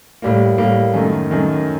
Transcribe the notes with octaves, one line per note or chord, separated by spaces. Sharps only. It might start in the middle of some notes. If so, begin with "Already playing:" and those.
A2 G3 A#3
A2 G3 A#3
F#2 D#3 A3
F#2 D#3 A3